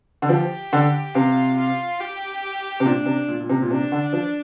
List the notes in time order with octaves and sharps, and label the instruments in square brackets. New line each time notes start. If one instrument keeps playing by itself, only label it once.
[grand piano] D3
[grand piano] F3 [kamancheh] G4
[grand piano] D3
[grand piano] C3 [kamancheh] F4
[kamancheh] F4
G4
[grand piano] C3
[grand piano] A#2 [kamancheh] D4
[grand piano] C3
A#2
A#2
C3
A#2
[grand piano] C3 [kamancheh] D4
[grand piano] D3
F3